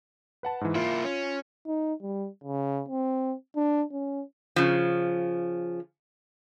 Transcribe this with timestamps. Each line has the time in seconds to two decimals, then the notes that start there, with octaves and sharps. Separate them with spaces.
0.43 B4 F#5 A5
0.61 G#2 E3
0.75 A#3 E4 F4
1.04 C#4
1.66 D#4
2.01 G3
2.44 C#3
2.89 C4
3.56 D4
3.92 C#4
4.56 C#3 F3